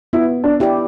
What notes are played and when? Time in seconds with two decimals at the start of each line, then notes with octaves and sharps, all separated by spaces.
0.13 B3 E4
0.44 D4
0.60 E4 G4 D5